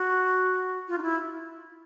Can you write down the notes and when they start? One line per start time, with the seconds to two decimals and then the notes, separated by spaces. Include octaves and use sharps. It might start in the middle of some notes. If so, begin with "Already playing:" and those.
Already playing: F#4
0.88 F4
0.98 D#4
1.02 E4